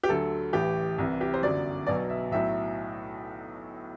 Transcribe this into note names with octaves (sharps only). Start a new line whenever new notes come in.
G4
D2 D3 F#3 A4
A1 A2 E3 G4
C2 C3 E3
G4
C5
G1 F#2 F#3 D5
B1 B2 F#3 D5
E5
B1 A2 F#3 E5